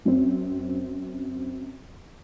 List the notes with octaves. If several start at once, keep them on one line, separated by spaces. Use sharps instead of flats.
F#2 C4